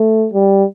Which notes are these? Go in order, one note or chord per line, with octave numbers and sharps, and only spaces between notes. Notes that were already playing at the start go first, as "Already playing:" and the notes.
Already playing: A3
G3